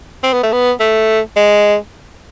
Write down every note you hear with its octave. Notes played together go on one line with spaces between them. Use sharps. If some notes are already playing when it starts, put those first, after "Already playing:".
C4
B3
A3
B3
A3
G#3